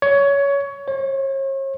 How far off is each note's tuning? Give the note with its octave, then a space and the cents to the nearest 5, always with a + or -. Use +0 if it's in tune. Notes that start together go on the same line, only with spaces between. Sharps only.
C#5 +20
C#5 -40